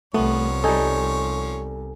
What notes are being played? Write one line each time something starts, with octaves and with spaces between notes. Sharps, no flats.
C2 F3 A3 B3 C#5
G3 D#4 A4 G#5